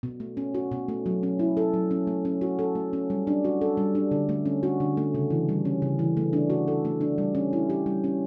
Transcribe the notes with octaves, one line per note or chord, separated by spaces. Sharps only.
B2
A3
C#4
F#4
B2
A3
F#3
C#4
E4
A4
F#3
C#4
A3
C#4
F#4
A4
A3
C#4
G3
D4
F#4
A4
G3
D4
D3
A3
C#4
F#4
D3
A3
C#3
E3
G3
C#4
C#3
E3
A3
D4
F#4
A4
A3
D4
G3
C#4
E4
G4
G3
C#4